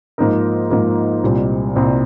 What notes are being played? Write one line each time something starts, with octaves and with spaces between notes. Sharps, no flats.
G#2 F3 A#3 D#4 A#4
G#2 F3 A#3 D#4 A#4
C2 A#2 G3 C4
C2 A#2 G3 C4